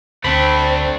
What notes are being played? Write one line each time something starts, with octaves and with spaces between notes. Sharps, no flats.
D2 A3 C4 D4 B5